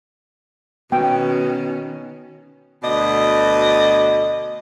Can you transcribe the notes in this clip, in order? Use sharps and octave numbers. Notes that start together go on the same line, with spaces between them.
B2 D#3 B3 C#4 G5
D2 B2 D5 D#5